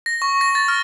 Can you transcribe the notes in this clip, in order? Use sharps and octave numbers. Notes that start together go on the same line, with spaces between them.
A#6
C#6
A#6
A6
F6